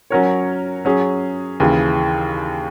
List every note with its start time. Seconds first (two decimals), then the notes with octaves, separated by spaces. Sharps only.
0.10 F#3 C#4 F#4 A#4 C#5
0.85 F#3 C#4 G#4
1.60 D#2 C#3 E3